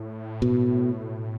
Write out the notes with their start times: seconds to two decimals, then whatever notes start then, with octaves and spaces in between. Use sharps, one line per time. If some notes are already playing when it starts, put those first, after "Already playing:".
Already playing: A2
0.42 B2